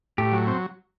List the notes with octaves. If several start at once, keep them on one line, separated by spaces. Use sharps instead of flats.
A2 G4
F#3
C4